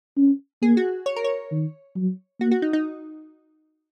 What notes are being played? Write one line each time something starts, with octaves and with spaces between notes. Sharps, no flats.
C#4
A#3 G#4
F#4
C#5
A#4
C#5
D#3
F#3
A#3 F#4
F#4
D#4
D#4